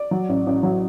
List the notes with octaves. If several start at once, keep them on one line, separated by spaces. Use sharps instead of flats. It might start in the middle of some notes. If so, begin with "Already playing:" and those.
Already playing: D5
F#3
A1
A1
F#3